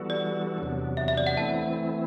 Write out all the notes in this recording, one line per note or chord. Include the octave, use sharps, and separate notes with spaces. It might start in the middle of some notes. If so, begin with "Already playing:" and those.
Already playing: E3 G3 B3 F#4 A4
D5
E2 C3 F#3 B3 D4
E5
E5
D5
F#5
E3 A3 C4 E4 A5